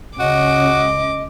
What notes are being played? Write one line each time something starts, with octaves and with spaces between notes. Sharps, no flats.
C#2 C#3 C#4 F#4 D#5 D6